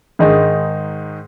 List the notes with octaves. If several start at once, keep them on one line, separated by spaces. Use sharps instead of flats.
G#2 D#3 G#3 D#4